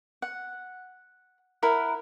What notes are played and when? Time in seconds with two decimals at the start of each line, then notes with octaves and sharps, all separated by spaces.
0.22 F#5
1.62 E4 A#4 F#5